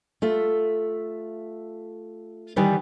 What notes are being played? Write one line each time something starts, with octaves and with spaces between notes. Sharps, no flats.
A3 F4 E5
D#3 E3 G3 D#4 B4